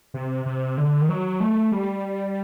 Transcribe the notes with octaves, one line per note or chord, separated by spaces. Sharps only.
C3
C3
D3
D#3
F#3
A3
G3